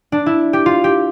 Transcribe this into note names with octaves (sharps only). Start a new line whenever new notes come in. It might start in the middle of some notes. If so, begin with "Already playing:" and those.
D4
E4
G4
F4
G4